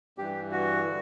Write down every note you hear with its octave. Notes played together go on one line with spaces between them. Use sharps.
G2 E3 G4
F#4
D3